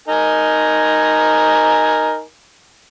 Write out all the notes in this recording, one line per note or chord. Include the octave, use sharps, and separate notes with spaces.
D#4 A#4 G#5